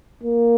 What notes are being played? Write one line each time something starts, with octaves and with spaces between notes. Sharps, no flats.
A#3